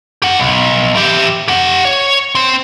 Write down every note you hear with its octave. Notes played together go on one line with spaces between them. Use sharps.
G4 F#5
B1
E3 G4
G4 F#5
C#5
C4 C5